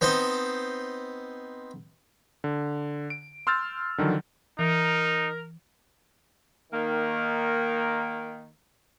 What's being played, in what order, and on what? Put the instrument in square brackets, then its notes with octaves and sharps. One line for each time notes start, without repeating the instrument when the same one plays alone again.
[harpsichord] B3 C4 D#4 C5
[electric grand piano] D3
D7
C6 E6 F6 G6 A6
D3 D#3 F3 F#3
[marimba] E3 [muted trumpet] D#4 [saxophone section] A#4
[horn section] D#3 A#3